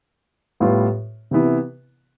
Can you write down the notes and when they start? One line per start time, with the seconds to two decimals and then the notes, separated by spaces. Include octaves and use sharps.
0.60 A2 G3 B3 F4
1.31 C3 E3 B3 E4